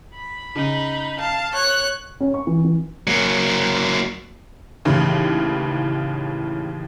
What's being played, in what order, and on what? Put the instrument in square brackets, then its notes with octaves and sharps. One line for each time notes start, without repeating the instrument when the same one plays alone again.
[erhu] B5
[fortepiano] C#3 [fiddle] D#4
[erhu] F5 [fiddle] A5
[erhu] C#5 [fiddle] F#6
[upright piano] C#4
C#6
E3
E3
[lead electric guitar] F#3 A#3
[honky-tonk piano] D#2 A2 C#3 E3